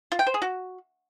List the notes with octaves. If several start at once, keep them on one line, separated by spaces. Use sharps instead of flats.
F4
G5
C5
G#4
F#4